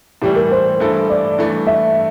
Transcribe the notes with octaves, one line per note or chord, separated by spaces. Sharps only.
A2 E3 G3 G4
A#4
C5
G2 E3 A3 E4 A4
D5
G2 E3 A3
E5